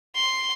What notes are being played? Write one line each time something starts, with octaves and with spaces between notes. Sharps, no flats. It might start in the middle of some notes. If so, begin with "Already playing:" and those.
C6